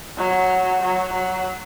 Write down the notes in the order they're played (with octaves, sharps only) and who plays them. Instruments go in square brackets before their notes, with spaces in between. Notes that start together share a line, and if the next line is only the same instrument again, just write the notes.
[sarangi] F#3
F#3
F#3